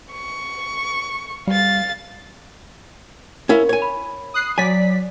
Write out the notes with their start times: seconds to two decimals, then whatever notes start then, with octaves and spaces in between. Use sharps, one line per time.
0.12 C#6
1.47 G3 F5 A6
3.49 C#4 E4 A#4 F5
3.69 C#5 G#5
3.82 B5
4.34 D#6 F#6 C7
4.58 F#3 D5 G#5 B6